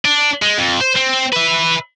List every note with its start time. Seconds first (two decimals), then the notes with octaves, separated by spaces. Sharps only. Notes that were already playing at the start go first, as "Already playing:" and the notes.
0.05 D4
0.42 G#3
0.58 F2
0.81 C5
0.96 C4
1.33 B4 E5